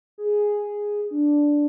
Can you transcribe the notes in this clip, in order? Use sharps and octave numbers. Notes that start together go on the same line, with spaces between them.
G#4
D4